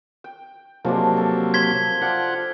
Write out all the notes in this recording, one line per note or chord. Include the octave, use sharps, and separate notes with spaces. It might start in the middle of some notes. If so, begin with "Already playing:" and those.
G5
C3 F3 F#3 G#3 A#3 D4
A4
C5 G#6 B6 G7
F4 D5 F#5 G5